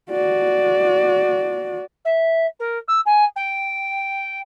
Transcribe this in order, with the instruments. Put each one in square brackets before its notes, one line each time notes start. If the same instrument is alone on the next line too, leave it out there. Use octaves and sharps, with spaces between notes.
[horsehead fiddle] F#4 D5
[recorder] E5
A#4
E6
G#5
G5